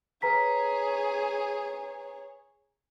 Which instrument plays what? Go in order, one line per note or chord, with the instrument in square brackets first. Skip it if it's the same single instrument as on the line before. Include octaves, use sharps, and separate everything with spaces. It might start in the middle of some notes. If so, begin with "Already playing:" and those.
[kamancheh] G#4 C#5 [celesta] B4 A#5 B6